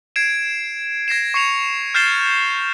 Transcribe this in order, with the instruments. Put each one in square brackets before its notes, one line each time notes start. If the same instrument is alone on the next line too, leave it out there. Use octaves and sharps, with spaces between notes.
[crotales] G#6 C7 D7 E7
G#6 A#6 C7 E7
C#6 C7 C#7 E7 F7
F6 G6 A6 C7 E7 G7